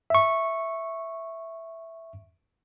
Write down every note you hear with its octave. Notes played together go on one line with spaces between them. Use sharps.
E5 C#6